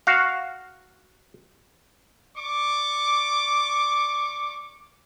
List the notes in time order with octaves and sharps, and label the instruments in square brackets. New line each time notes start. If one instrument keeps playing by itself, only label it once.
[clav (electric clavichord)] F#4 F5
[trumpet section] D5 C#6 D6